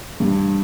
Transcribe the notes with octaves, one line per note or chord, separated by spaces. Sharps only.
G2